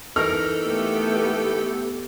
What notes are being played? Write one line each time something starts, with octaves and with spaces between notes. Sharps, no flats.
E3 D#4 A4 A#4 F6
A3 B3 G4